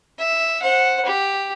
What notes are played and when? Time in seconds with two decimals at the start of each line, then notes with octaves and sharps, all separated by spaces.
0.18 E5
0.62 C5 F#5
1.05 G4